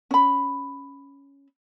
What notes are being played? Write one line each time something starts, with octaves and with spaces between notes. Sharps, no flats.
C#4 B5